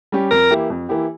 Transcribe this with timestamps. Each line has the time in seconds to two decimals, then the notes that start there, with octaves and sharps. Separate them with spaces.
0.12 G3 C#4 G4
0.31 F2 A#4
0.50 E3 A#3 E4 G4
0.70 F2
0.89 E3 A#3 E4 G4